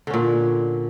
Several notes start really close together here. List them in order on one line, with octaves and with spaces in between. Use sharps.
D3 C#4 A#2